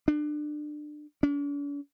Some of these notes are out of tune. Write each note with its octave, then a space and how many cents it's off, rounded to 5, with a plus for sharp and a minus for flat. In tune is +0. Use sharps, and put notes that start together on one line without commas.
D4 +25
D4 -45